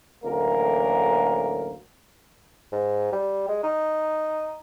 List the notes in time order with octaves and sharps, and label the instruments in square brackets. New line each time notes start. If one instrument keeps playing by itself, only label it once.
[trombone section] A1 D2 F#3 A#3 A#4
[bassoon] G#2
G3
G#3
D#4